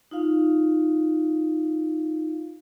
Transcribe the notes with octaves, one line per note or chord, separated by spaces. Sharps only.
D#4 F4 F5